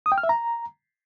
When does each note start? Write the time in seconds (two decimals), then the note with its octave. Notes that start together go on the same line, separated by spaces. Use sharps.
0.06 D#6
0.12 G5
0.18 F6
0.23 E5
0.29 A#5